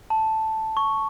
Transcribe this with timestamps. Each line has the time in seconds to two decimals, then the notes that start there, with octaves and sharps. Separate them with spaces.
0.10 A5
0.77 C#6